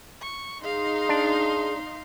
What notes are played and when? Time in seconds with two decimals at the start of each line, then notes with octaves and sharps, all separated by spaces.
0.21 C#6
0.64 D#4 G#4 F5 C6
1.09 D4